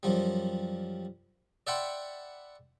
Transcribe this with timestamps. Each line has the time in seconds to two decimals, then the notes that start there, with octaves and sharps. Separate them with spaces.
0.03 F#2 F3 G3
1.67 D5 E5 F#5 G5 B5 C6